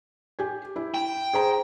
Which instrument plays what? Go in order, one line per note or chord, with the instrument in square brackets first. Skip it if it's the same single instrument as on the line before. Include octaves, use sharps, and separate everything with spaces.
[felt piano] G4 G#5
E4
[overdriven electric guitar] G5
[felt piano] G#4 C5 A#5